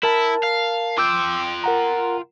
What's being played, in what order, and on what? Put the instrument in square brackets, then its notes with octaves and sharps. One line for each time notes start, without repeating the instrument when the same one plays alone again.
[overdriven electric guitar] E4 [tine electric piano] A#4 A5
[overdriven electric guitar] F5
[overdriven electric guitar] F4 G5 [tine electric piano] D6 E6 G6
[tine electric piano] A#4 F#5 A#5